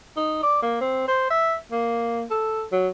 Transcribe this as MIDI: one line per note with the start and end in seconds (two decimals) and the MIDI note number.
0.17 0.39 63
0.43 0.60 74
0.62 0.78 58
0.81 1.05 60
1.08 1.26 72
1.31 1.56 76
1.72 2.23 58
2.31 2.65 69
2.72 2.89 54